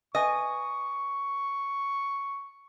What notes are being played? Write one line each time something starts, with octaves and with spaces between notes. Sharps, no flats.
B4 D#5 G#5 C#6